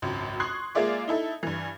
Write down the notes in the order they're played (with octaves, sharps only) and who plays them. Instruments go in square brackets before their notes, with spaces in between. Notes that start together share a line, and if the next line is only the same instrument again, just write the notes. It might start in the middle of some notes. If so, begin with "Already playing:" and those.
[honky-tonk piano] G#1 C#2 F#2
C6 C#6 D#6 F#6 G#6 C7
G#3 A#3 F4 G#4 D5 E5
D#4 E4 A4 E5
G2 E3